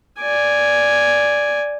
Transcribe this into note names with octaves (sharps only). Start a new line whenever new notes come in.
D5 G#5